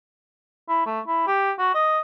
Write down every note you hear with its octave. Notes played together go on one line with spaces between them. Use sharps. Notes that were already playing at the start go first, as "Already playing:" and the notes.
E4
A3
E4
G4
F#4
D#5